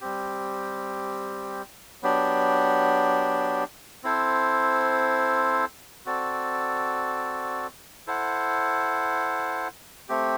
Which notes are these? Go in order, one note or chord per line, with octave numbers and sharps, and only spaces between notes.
G3 C4 G4
F#3 B3 D4 G4
C4 E4 A4 C5
C4 F#4 A4 D5
E4 A4 C5 F#5
A3 C4 G4